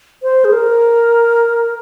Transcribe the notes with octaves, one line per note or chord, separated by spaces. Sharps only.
C5
G#4
A#4